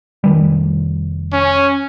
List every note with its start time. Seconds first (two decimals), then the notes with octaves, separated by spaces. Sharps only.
0.24 F1 D#3 G3
1.33 C#4